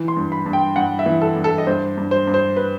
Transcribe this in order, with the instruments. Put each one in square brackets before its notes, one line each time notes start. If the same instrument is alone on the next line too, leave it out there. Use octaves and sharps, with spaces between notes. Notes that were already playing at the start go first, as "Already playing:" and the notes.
Already playing: [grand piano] E3
C6
G2
B5
G2
G5
G2 F#5
E5
E3
A4
G2
A4
D#5
G2 C5
G2
C5
G2
C5
B4